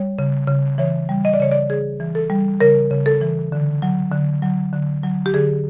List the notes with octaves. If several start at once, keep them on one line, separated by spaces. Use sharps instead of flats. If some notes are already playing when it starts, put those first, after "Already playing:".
Already playing: G3 C#5
C#3
C#3
E3 C#5
G3
D#5
D5
C#3 C#5
D5
C#3 G#4
E3
A4
G3
C#3 A#4
C#3
A4
E3
D3
F#3
D3
F#3
D3
F#3
G4
D3 G#4